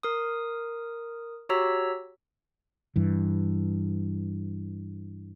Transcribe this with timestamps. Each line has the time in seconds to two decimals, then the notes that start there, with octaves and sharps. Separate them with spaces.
0.03 A#4 D#6
1.49 F#4 G4 C#5 A#5 E6 B6
2.96 G2 E3